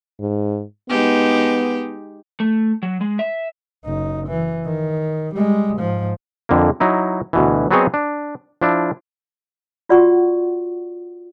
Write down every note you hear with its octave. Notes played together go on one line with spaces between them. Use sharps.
G#2
G#3 B3 D#4 G4
A3
F#3
G#3
E5
F#1 D#4
E3
D#3
G3 G#3
G#2 F3
F2 D3 F3 A#3
F#3 D#4 E4
D2 B2 E3
F#3 B3 C4 G#4 C#5 D#5
D4
F3 D4 E4
F4 F#4 D5 F#5 C6 C#6